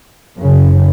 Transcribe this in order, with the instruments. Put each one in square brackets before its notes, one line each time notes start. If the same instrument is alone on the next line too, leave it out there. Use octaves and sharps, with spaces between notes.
[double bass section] F#2 C#3